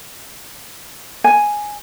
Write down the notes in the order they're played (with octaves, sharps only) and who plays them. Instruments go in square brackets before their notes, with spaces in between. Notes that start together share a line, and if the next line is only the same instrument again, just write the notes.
[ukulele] G#5